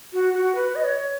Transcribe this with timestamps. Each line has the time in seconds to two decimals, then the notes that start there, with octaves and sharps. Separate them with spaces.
0.13 F#4
0.34 F#4
0.55 B4
0.75 D#5
0.84 C#5